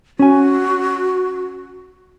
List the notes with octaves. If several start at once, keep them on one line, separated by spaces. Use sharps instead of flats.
C#4 F#4 G#5